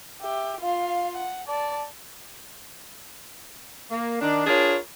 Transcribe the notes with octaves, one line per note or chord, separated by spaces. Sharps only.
G4 E5
F4 F5
F#5
D5 A5
A#3
D#3 D4
D4 F4 G#4 A#4 C#5